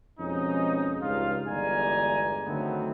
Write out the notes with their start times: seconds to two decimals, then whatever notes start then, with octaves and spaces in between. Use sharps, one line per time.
0.20 F2 B2 G#3 C#4 D#4
1.02 C#2 G2 C#3 D#4 F4 F5
1.49 G1 E2 G#3 D5 G#5 A#5
2.47 D3 D#3 F#3 A3 B3 C4